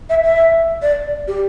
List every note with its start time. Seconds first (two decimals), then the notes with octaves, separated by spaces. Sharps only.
0.10 E5
0.24 E5
0.82 D5
1.27 G4